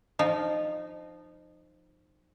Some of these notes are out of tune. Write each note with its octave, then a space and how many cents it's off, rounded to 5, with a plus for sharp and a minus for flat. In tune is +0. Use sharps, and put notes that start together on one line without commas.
F3 +0 D#4 -20